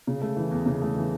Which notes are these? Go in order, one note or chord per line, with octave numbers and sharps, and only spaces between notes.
C#3
A3
E3
E2
C#3
A3
E3